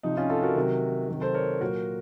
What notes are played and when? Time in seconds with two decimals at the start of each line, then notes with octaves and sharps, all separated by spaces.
0.03 C3 F3 D#4
0.17 C#4 F4
0.30 F4 A4
0.42 F#4 A#4
0.56 C3 D#3 F#3
1.08 C3 D#3 F#3
1.21 A4 C5
1.34 A#4 C#5
1.61 A#2 F#3 F#4 A#4